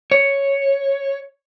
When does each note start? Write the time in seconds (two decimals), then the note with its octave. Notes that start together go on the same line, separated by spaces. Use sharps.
0.11 C#5